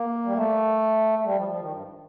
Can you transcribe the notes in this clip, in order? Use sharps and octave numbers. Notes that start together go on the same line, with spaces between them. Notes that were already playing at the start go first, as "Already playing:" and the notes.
Already playing: A#3
G3
A3
A3
G3
F3
F3
D#3
G2